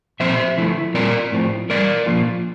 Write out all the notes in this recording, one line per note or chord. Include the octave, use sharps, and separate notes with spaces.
A#2 F3 C4 C5 E5
D3 F3 A3 E4
A#2 G3 C4 F4 A#4 D5
A2 F3 C4
A2 E3 G3 A#4 D5
A#2 F3 A#3 F4